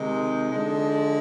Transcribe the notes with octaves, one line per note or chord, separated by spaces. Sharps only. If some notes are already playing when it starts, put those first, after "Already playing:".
Already playing: C3 D#3 G#3 D#4
D3 F3 G#3